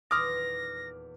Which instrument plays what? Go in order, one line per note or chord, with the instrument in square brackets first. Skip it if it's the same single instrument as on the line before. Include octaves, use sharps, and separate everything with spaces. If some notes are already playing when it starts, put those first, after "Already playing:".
[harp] D#1 E2 [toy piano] C6 D#6 [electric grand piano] D6 F6 [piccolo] A#6